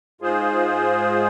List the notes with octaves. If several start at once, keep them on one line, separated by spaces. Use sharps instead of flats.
G#2 G#3 F4 G#4 C5